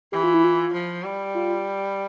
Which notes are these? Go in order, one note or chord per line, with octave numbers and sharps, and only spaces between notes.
E3 G4
F4
E4
F4
F3
G3
F4